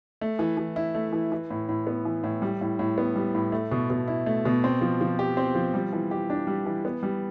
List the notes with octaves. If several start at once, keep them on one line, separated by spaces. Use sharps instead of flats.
A3
E3
E3
E4
A3
E3
E3
A2
A2
B3
E3
A2
G3
A2
A2
B3
G3
A2
A3
B2
B2
E4
A3
B2
C4
F3
F3
G4
C4
F3
G3
E3
G4
D4
G3
E3
B3
G3